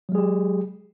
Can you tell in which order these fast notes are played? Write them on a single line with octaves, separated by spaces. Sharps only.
F#3 G#3 G#4 G4